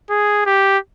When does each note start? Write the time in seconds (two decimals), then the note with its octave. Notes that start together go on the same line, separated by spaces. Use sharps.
0.10 G#4
0.46 G4